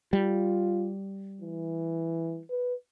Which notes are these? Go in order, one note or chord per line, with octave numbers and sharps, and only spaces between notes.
G3 F4
E3
B4